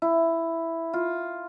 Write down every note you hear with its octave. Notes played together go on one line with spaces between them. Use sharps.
E4
F4